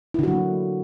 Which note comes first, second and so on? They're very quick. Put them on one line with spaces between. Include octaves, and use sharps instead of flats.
E4 D3 F#4 F#3 A#3